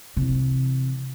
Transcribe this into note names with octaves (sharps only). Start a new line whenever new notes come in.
C3 E3